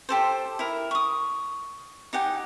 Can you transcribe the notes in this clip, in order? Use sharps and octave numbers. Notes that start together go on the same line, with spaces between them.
G4 A4 C5
E4 A#4
C#6 D#6
D#4 G4 F#5 G#5